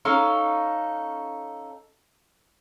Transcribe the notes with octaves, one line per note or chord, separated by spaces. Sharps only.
C#4 D#4 A4 F5